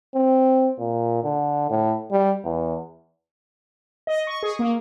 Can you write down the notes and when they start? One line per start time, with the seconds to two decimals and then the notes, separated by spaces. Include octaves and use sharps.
0.15 C4
0.79 A#2
1.24 D3
1.70 A2
2.12 G3
2.44 E2
4.07 D#5
4.27 C#6
4.43 G#4
4.59 A#3